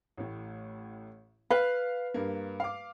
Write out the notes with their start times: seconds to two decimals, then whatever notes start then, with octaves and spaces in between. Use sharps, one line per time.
0.17 A1 A2
1.51 B4 F5
2.14 G2 A#3
2.60 F5 D6